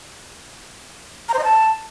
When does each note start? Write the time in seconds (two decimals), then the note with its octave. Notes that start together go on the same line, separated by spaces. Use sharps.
1.29 A#5
1.34 C5
1.39 D#5
1.44 A5